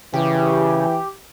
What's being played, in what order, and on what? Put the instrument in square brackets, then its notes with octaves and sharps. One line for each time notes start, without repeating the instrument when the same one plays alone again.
[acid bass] C#3 [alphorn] E3 [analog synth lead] G4